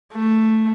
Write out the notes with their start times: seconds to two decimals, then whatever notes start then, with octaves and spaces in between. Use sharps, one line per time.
0.13 A3